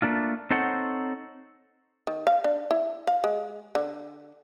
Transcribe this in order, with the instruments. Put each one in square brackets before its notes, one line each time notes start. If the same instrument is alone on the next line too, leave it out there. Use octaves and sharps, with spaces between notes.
[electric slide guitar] A3 A#3 D4 F4
C4 D#4 A4 C5 C#5 F#5
[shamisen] D#3
F5
D4
E4
F5
G#3
D3